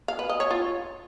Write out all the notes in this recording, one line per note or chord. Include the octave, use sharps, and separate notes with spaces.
F5
B4
D#5
C#5
F4